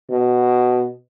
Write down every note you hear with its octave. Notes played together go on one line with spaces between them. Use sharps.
B2